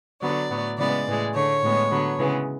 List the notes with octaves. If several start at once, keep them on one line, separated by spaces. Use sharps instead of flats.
D3 F#3 B3 D5
A2 F#3 B3
C#3 E3 G#3 B3 D5
A2 E3 G#3
D3 A3 C#5
A2 G#3 B3
D3 F#3 B3
C#3 E3 G#3 B3